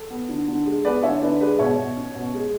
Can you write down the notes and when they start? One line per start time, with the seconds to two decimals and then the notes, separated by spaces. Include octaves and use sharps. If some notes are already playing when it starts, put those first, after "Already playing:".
Already playing: A4
0.10 B3
0.29 D3
0.48 D3
0.66 G#3
0.85 B3 B4 D5
1.03 D3 C#5 E5
1.22 D3 B4 D5
1.40 G#3 B4 D5
1.59 B2 C#5 E5
1.78 B2
1.97 C#4
2.15 B2
2.34 G#3